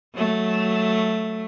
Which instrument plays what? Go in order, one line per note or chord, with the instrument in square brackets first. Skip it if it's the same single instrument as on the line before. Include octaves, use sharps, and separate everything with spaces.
[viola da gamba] F#3 A3